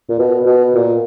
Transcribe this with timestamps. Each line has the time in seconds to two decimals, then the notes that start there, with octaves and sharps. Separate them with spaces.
0.09 A#2
0.19 B2
0.46 B2
0.74 A#2